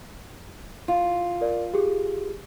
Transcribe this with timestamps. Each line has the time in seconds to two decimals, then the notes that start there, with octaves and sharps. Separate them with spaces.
0.88 F4
1.41 A#4 D5
1.74 G4 G#4